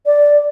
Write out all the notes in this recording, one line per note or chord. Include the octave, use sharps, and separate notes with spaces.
D5